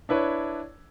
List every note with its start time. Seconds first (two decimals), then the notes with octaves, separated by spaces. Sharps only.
0.09 D4 E4 B4 C#5